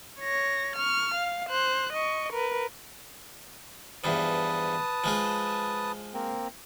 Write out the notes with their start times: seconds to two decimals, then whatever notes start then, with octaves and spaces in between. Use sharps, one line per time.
0.20 C#5 A#6
0.76 C#6 F6
1.14 F5
1.50 C5 F#6
1.93 D#5 C#6
2.33 A#4 B4
4.04 E2 G2 F3 B4 A5 D#6
5.04 F3 G#3 F4
6.14 A#3 C4